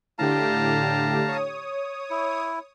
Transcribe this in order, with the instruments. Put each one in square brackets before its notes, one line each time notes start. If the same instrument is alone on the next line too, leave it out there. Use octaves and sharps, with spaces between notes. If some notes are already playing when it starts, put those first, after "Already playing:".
[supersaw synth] A2 D3 G4 [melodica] F5 A5 A#5
[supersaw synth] C#5 D#6
[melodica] E4